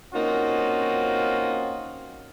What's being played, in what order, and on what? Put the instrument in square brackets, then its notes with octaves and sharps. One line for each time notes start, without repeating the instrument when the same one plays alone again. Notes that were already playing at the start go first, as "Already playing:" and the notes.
[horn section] A#3 C4 C#4 D#4 F4 F#4